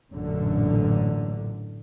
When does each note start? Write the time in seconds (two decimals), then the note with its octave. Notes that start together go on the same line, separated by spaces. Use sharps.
0.11 A1 F#2 A#2 D3